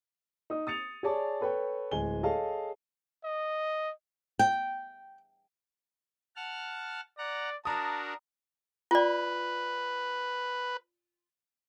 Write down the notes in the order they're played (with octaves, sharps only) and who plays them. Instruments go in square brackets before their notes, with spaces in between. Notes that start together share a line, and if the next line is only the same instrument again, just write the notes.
[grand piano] D#4 D#6
D#6 A6 C#7 F7
G#4 C#5 D5 A5
A4 B4 C#5 G5
D1 G#3 G#5 G7
G#4 A4 C#5 D#5 F5 A5
[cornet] D#5
[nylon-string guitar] G5
[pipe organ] F#5 A5 F6
[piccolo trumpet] D5 [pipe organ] F#5 A#5
[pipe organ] D4 F#4 A#4 [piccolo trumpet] A5 [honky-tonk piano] A#5 D#6
[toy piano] F4 D5 [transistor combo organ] B4